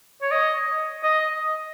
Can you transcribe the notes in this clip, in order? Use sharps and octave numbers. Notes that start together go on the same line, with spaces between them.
C#5
D#5
D#5